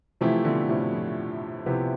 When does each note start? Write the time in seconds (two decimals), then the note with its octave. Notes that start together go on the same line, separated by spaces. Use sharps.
0.21 C3 E3 F3 A3 E4 G4
0.45 B2 D3
0.69 A2 C3
0.93 F2
1.66 C3 F3 B3 E4 G4